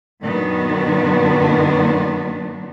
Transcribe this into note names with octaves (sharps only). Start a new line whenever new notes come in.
F#2 A#2 D#3 F#3 B3 D4